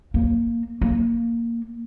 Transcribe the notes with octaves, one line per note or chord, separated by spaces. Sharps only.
A#3
A#3